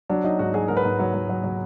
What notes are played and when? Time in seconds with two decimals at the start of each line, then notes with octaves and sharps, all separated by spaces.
0.10 F#3 D4
0.24 F#3 D#4
0.39 G#2 F#4
0.54 F#3 G#4
0.68 G#2 A#4
0.77 B4
0.85 G#2
0.99 F#3
1.14 F#3
1.29 F#3
1.44 F#3